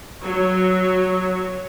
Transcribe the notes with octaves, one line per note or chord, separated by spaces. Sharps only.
F#3 C#5